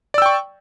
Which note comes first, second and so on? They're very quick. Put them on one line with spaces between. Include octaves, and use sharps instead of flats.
D5 E6 G5 C#6